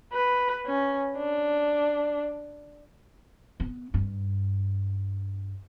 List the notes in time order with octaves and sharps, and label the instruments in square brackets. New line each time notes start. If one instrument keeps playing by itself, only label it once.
[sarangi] B4
C#4
D4
[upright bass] B3
G2